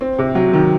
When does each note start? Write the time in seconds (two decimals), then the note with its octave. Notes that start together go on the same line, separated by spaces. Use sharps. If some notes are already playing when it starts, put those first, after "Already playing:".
0.01 C4
0.18 C3
0.35 F#3
0.53 D#3